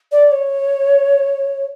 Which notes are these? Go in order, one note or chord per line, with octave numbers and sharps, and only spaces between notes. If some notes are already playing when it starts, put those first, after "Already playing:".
D5
C#5